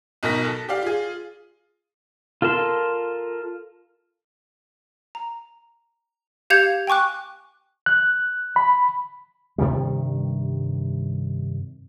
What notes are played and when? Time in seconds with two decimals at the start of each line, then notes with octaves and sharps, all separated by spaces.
0.23 B1 B2 D#4 A#4 A#6 B6
0.45 A4
0.69 G4 D5 F5
0.82 F4 G#4
2.42 F4 A4 A#4 A5 C6
5.15 A#5
6.50 G4 F5 G6 G#6 C#7 F7
6.87 G5 G#5 C#6 D6 F#6
7.86 F#6
8.56 B5
9.58 G2 C3 D#3 G3